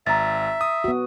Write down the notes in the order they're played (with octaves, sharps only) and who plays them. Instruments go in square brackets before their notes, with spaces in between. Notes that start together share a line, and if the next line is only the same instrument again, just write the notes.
[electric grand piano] G#1 [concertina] E5 [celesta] A#5 A6
[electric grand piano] D#6
[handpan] B3 F#4